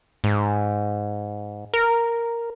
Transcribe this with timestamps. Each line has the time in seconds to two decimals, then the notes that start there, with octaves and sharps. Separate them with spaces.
0.24 G#2
1.74 A#4